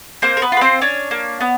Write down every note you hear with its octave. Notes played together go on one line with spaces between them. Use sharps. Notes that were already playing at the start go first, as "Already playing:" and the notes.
A#3 C4 C5
A#4
B3 B4
F4 B4
C4 C5
C#4 D4 C#5
A#3
B3